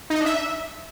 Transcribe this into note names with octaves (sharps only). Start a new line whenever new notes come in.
D#4
D#5
D4
E5